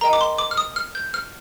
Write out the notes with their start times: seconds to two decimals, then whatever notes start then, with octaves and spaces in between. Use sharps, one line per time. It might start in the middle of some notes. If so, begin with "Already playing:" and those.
0.01 A#4 D#5 G5 A#5
0.13 D6
0.21 C6
0.38 D6
0.51 F6
0.57 D#6
0.76 F6
0.95 G6
1.14 F6